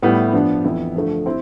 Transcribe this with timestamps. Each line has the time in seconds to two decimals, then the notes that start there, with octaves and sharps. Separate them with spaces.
0.02 A2 G3 B3 E4
0.33 G2 F3 B3 D4
0.64 F2 E3 B3 E4
0.94 G2 D3 F3 A3
1.26 C4 E4